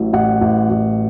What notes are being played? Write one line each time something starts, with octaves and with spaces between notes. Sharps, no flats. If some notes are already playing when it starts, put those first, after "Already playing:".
Already playing: A1 A2 F#3
A1 F#5
A1
A1